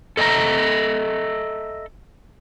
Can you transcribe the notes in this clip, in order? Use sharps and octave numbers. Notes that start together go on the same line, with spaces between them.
A4 D#5 E5 G#5 A#5